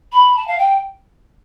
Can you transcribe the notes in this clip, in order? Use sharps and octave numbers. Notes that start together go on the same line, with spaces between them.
B5
A5
F5
G5